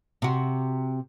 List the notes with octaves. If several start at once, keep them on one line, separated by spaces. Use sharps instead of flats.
C3 F#4